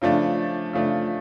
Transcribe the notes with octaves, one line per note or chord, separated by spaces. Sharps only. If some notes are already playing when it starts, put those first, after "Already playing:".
C#3 F3 A3 D4
C#3 F3 A3 D4